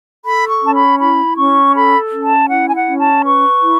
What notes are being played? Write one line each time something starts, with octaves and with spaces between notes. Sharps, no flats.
A4 B5
C#6
C#4 A5
B5
E4 B5
C#4 C#6
A4 B5
C#4
A5
E4 F#5
G#5
F#5
C#4
A5
B4 C#6
E4